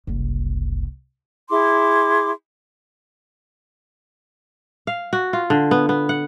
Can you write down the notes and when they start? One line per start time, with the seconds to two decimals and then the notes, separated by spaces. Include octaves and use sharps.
0.07 F#1 C2
1.50 E4 G#4 C6 D6
4.87 F5
5.13 F#4
5.33 F4
5.50 D3
5.71 B3
5.89 B3
6.09 F#5